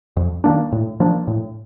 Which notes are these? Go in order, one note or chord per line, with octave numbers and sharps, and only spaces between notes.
F2
D#3 A#3 D4
A2
F3 A#3 D4
A2